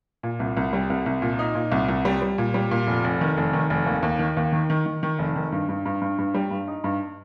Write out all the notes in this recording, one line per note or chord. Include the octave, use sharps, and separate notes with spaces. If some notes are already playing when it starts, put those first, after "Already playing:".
A#2
C2
C2
G3
C2
C2
A#2
D#4
A#2
C2
C2
G3
G3
A#2
G3
A#2
F1
F1
D#3
F1
D#3
F1
D#2
D#2
D#3
D#2
D#3
D#3
D#3
D#3
F1
D#3
G2
G2
G2
G2
G2
G3
G2
D#4
G2